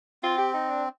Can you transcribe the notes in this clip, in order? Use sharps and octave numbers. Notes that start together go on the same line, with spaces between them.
C4 F4
G4
D#4
D4